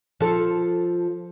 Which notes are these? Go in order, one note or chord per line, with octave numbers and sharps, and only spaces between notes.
F3 A4